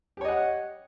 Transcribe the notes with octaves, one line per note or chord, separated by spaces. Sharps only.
G4 C#5 D#5 F#5